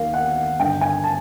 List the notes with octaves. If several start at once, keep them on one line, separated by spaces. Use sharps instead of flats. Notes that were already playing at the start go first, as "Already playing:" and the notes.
Already playing: D#2 D#3 F5
F#5
G2 D3 G5
G#5
A5